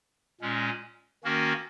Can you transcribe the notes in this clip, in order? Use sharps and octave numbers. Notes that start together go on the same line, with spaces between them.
A#2 G#3 C#4
D#3 A#3 C#4 F#4 A#4